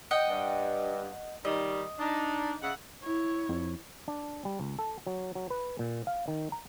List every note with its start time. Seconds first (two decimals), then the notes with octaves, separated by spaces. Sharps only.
0.11 D#5 F#5 G5
0.28 G2
1.45 D#3 G3 D#5
1.99 D4 D#4
2.62 C#3 E5 F#5
3.03 E4 C#5
3.49 F2
4.08 D4
4.45 G3
4.60 C#2
4.79 A4
5.07 F#3
5.35 F#3
5.50 B4
5.79 A#2
6.07 F5
6.28 D#3
6.52 A#5